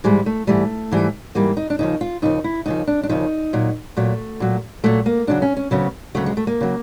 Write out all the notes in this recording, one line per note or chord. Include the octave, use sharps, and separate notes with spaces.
G#2 E3 G3 G#3
A3
G#2 E3 G3 A3
G#2 E3 G3
G#2 E3 G3 A#3
D#4
D4
D#2 C#3 F3 D#4
F4
D#2 C#3 F3 D#4
E4
D#2 C#3 F3 D#4
D4
D4
D#2 C#3 F3 D#4
A#2 F#3
A#2 F#3 A3
A#2 F#3
A#2 F#3 A3
A#3
D2 C#3 F#3 D4
C#4
C#4
D2 C#3 F#3 B3
D2 C#3 F#3 A3
G#3
A3
A#3
C#3 F#3